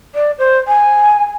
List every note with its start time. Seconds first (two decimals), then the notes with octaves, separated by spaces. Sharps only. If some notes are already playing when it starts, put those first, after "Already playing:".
0.15 D5
0.38 C5
0.68 G#5